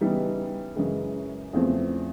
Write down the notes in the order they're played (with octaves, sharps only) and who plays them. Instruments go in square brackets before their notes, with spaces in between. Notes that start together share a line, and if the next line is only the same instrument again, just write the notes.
[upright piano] C#3 E3 G3 B3 D#4
F#2 C#3 E3 G#3
E2 C#3 F3 A3 C4